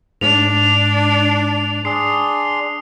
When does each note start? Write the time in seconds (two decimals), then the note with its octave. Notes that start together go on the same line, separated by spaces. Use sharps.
0.21 G#2 D4 F7
1.85 D4 G#4 C6 D#6 C7